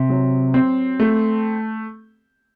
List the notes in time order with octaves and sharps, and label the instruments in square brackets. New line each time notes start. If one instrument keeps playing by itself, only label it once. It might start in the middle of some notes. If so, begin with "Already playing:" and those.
Already playing: [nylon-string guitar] C3
[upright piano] F#3
C4
A3